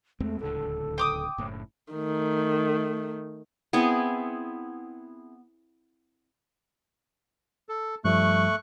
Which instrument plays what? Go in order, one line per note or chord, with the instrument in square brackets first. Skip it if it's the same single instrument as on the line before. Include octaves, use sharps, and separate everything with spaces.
[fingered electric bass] E2 G#3 C4 [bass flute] A3
[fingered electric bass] D1 C#2 D3 [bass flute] A4
[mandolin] G5 D6 D#6
[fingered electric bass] F#1 A2
[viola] D#3 A3
[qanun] B3 C4 E4 G#4
[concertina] A4
[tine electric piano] G2 F3 G3 [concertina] A3 C#6 F#6